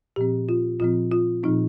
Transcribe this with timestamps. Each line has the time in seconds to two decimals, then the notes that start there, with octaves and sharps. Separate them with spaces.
0.16 A#2 F3 C4 G4
0.49 F4
0.80 A#2 F3 C4 F4
1.12 F4
1.43 A#2 F3 C4 D#4